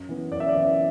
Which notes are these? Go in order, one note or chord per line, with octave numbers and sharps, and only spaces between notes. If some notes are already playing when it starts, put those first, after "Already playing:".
Already playing: F#2
E3 B3
F#2 D5
E5
D5
E3 B3